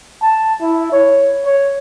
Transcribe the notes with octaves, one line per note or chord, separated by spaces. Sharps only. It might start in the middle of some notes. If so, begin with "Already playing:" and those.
A5
E4
C#5
C#5